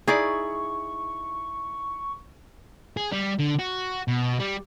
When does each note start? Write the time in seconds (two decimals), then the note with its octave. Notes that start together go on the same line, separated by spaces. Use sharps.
0.08 D#4 E4 G#4 D5 C#6
2.97 G#4
3.12 G3
3.39 D3
3.59 F#4
4.08 B2
4.39 G3